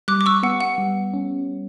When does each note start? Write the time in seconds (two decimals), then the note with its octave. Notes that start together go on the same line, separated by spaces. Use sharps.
0.08 G3 D6 F#6
0.21 D6
0.26 C#6 E6
0.43 B3 F#5
0.61 F#5
0.78 G3
1.14 C#4